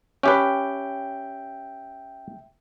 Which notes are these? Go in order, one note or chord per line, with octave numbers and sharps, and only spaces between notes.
C#4 G4 B4 E5 G5